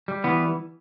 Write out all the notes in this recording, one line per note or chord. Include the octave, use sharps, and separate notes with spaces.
G3
E3 B3